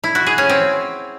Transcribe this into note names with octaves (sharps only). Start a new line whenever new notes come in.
E4
F#4
G#4
C#4
C4